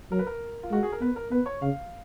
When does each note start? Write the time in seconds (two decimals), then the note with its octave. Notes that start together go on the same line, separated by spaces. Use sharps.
0.11 F#3 A#4
0.19 B4
0.27 A#4
0.63 F4
0.71 G#3 F#4
0.83 G#4
0.92 A#4
1.01 B3 B4
1.16 A#4
1.31 B3 B4
1.46 C#5
1.62 C#3 F5